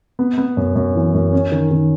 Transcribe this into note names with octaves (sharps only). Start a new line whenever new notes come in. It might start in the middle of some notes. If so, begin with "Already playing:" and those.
B3
B3
F#2
F#2
E3
F#2
C#4
D#3
D#3